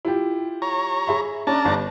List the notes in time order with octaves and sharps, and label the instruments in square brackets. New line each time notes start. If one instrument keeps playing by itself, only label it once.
[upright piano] E4 F4 G4
[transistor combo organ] C#5 A#5
[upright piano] G#4 E5 B5
[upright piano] C#4 [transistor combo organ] D4 A5 A#5
[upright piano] G1